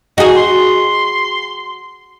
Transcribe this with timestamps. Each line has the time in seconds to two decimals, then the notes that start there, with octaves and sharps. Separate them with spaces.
0.18 D#4 F#4 G#4
0.37 C6